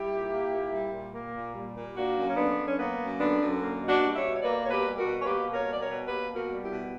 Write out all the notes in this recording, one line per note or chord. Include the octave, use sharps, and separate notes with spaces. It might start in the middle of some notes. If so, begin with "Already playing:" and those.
Already playing: G3 E4 G4
A#2
A#3
A#2
G3
A#2
A#3
A#2
G3
A#2
A#3 D4 F#4
F#2
C#4
D3 B3 D4
F#2
C#4
A#3 B3
F#2
D3 B3 D4
F#2
A#3
B2
D4 F#4
G3
C#5 E5
B2
C#5
A#3 B4 D5
B2 C#5
G4 B4
G3
F#4 A#4
B2
C#5
A#3 G4 B4
B2
A#4 C#5
G3
D5
A#4 C#5
B2
A#3 G4 B4
B2
F#4 A#4
G3
E4 G4
B2